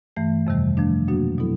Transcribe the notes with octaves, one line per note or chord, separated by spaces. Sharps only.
G2 E3 A3
F2 C3 D#3 G3
F3 A3 D4
B2 F#3 A#3 D4 F#4
B2 F#3 B3 E4 A4